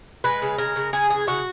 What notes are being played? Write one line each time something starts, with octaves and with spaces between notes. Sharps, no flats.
G#3 B4
C#3
G#3 A#4
C#3
C#3 G#4
E3 G#4
C#3 F#4